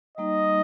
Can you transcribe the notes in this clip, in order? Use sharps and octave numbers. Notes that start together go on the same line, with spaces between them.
G3 A#3 D#4 D#5